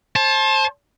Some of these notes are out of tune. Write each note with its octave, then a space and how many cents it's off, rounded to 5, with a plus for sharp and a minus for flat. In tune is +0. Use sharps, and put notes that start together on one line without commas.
C5 +35 A5 -20